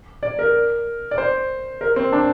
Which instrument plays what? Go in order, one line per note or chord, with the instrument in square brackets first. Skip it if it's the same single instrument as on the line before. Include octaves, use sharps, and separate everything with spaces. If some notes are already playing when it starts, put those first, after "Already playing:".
[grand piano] D5
A#4
D5
C5
A#4
C4
D4